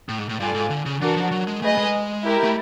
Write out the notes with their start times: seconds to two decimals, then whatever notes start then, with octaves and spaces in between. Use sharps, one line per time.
0.09 A2
0.19 G#2
0.29 A2
0.40 G2 F4 A4 D5 F5 G#5
0.54 G#2
0.70 D3
0.86 C#3
1.01 E3 D4 F#4 A#4
1.16 F3
1.31 F#3
1.47 G#3
1.62 A3 G#4 B4 D#5
1.78 G#3
2.24 E4 G4 A#4
2.44 A3